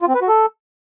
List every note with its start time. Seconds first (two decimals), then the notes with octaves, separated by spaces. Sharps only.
0.01 F4
0.08 C4
0.15 B4
0.22 F#4
0.28 A4